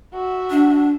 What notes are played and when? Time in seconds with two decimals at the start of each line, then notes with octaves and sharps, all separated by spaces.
0.13 F#4 E5
0.50 D4